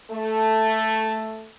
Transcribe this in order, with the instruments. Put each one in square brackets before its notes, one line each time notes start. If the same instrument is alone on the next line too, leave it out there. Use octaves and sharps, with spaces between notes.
[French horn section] A3